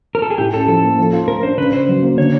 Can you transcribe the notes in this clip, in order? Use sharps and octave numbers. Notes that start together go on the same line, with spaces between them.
A#4
A4
G#4
A2 G4
C#4 A4
F3 A4
A#3
F3
F4
A3 A#4
D4 C5
C#3 B4
C#3 C5
F#3
A#3
D3 C#5